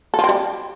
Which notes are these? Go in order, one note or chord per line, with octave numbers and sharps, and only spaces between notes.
A4
F3
C4
G3